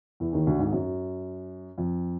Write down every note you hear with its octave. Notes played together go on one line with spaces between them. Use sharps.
E2 E3
D#2 D#3
D2 D3
G#1 G#2
F#2
F2